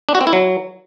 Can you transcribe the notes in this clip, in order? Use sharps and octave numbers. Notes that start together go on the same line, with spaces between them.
D4
F#4
C4
E4
F#3